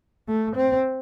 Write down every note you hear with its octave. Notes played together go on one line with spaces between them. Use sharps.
A3
C4